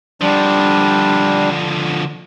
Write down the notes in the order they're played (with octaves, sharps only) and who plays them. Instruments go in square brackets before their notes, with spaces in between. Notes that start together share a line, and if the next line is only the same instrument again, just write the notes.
[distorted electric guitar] D3 F3 [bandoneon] G3 D4